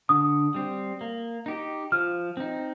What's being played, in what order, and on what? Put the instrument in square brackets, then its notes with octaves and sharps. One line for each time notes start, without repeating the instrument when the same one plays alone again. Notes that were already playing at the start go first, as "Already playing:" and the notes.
[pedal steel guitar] D3 [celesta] D#6
[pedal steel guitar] G3 C4
A#3
D#4 G4
[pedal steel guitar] F3 [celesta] F6
[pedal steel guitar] C4 D#4